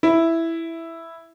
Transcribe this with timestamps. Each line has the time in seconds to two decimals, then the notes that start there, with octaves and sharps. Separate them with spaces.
0.03 E4